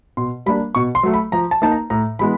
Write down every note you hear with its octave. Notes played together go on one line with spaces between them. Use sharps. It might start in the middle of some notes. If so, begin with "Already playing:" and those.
B2 C6
G3 A#3 D4 B5
B2 C#6
C6
F#3 A3
B5
F3 A#5
A5
A#3 D#4 A5
A#5
A2 A#5
E3 G#3 B3 B5